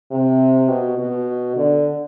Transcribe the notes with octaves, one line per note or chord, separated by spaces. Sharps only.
C3
B2
B2
D3